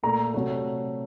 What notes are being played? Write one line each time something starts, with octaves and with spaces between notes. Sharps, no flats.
A#2 A3 A#5
C3 F#3 A3